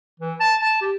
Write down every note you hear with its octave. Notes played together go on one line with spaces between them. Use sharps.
E3
A5
A5
G4